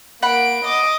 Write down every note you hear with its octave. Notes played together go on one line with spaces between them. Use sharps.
A#3 F#5 B5 D7
D#5 D6